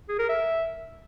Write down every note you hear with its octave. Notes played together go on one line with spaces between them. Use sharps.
G#4
A#4
E5